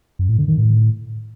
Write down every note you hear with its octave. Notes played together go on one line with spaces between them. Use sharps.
F#2
A2
D3
D#3
A2